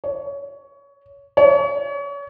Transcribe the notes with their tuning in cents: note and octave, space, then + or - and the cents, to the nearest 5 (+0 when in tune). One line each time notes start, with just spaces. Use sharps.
C#5 +20
C#5 +35